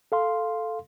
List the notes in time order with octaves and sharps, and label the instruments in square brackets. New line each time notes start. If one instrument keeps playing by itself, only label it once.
[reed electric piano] A4 F5 C6